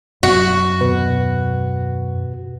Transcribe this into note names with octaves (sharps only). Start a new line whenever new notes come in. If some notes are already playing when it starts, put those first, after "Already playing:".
F#2 F#4
D#2 B2 B4